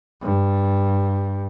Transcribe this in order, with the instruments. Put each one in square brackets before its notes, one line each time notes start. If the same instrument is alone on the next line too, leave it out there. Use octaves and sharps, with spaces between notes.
[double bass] G2